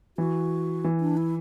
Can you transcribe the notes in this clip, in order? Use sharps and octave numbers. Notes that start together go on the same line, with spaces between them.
E3 F#4
E3
D4
E4